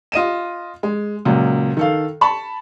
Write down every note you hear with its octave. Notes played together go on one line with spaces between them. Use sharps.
F4 D#5 D#7 E7
G#3
C#2 A#2 F#3
D#3 A4 F5
A5 B5 C#6